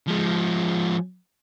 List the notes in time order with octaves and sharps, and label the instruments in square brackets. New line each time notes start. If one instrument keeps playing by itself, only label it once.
[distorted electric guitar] F3 G#3